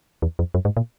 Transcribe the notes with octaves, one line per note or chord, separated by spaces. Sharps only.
E2
F2
F#2
G#2
A#2